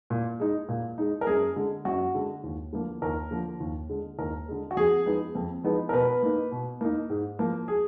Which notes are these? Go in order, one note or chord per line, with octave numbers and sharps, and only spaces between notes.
A#2
G#3 D#4
A#2
G#3 D#4
A#4
F#2 G#4
D3 G#3
F#2 F#4
D3 G#3
D#2
D3 F3 A#3
D#2 A#4
D3 F3 A#3
D#2
D3 G#3
D#2 A#4
D3 G#3
F#4
F2 G#4
F3 G#3 B3 D#4
F2
F3 G#3 B3 D#4
A#4
B2 B4
A#3 D#4
B2
A#3 D#4
G#2
F3 A#3
G#4